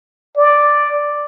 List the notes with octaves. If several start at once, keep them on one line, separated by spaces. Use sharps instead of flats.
D5